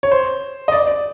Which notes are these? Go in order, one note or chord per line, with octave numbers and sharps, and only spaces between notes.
C#5
C5
D#5
D5
D5